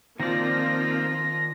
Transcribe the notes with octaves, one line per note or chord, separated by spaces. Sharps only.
D#3 F3 A#3 C4 F4 D5 A#6